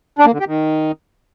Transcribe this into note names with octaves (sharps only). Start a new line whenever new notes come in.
D4
A#3
D3
G4
D#3